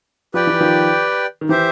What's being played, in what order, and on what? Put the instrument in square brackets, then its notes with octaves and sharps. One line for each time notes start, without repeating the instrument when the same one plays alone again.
[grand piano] F3 [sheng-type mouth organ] G4 B4 D5 G5
[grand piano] E3
D#3 F3
D#3
[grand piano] E3 [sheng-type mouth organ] G4 C5 E5